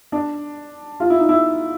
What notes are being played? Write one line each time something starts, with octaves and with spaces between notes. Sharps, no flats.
D4
F4
E4
D#4
E4